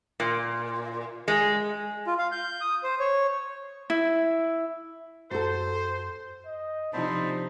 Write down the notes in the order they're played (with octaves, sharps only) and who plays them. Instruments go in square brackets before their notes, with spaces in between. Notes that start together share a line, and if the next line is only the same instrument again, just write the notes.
[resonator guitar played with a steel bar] A#2
G#3
[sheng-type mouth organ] F4
F5
G6
D#6
C5
C#5
[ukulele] E4
[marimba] F#2 [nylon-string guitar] F#4 A4 [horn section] C5
[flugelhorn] D#5
[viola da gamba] C3 F3 C4 [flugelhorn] D4 [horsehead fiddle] D#4 [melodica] C5 A5 B5